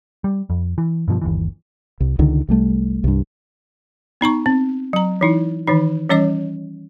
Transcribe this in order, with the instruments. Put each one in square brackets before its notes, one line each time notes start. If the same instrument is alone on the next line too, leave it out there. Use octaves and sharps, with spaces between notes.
[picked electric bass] G3
F2
E3
G2 B2 E3 F3
G1 D#2 E3
[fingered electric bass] C2
C#2 D3 D#3
C2 G3 A3
C2 G2
[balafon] B3 D#4 A#5 C#6
C4
F#3 A#5
E3 D#4 E4
D#3 E3 D#4
E3 G3 C#4 C#5 D#5 D6